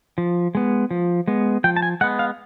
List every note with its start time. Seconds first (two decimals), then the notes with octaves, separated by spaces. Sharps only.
0.18 F3
0.55 G#3 B3
0.91 F3
1.27 G#3 B3
1.64 F3 G5
1.76 A5
1.82 G#5
2.01 G#3 B3 F#5
2.19 F5